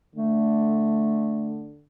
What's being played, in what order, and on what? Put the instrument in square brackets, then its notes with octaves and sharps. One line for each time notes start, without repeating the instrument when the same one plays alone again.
[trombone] D3 [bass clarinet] A3